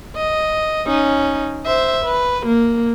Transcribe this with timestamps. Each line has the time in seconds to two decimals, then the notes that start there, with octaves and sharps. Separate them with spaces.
0.16 D#5
0.87 C#4 D#4
1.66 C5 E5
2.05 B4
2.46 A#3